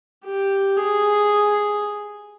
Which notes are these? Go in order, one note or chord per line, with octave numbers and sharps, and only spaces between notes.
G4
G#4